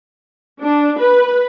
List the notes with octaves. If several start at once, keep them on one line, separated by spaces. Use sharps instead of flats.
D4
B4